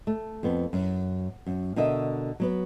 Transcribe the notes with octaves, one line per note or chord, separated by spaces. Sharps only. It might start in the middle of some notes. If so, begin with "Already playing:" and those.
A3
F2 B3
F#2
F#2
B2 D3 A#4 D#5 E5
F#3 B3 B4